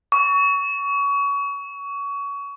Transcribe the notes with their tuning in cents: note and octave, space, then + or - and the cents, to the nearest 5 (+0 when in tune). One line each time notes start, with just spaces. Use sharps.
C#6 +25